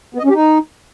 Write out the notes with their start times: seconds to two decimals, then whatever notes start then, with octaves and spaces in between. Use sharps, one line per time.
0.14 B3
0.19 D#5
0.24 C#4
0.29 G4
0.35 D#4